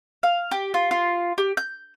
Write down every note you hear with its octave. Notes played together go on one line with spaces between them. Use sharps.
F5
G4
F4
F4
G4
G6